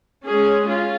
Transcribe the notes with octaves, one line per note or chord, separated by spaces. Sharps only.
G#3 C#4 G#4
C#4 F4